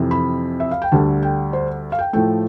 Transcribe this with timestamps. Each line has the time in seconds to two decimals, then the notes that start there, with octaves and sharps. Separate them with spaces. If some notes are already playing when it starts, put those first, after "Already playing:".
Already playing: F2 C3 E3
0.11 B5
0.60 E5
0.71 F5
0.82 G5
0.92 D2 D3 G3 A5
1.22 G5
1.53 C5
1.92 F5
1.99 G5
2.13 A2 F3 A3 G5